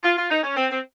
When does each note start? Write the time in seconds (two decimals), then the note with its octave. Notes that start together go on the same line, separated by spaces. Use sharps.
0.03 F4
0.17 F4
0.30 D#4
0.43 C#4
0.56 C4
0.69 C4